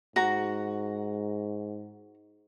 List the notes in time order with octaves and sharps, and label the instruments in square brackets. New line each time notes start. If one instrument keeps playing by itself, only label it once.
[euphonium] G#2 [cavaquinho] F#4 A#5